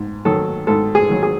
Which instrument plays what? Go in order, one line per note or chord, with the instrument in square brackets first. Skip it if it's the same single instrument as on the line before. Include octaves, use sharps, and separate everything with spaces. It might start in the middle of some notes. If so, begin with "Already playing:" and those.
Already playing: [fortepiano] G#2
D#3 F#3 A4
G#2 A4
G#4
D#3 F#3
G#4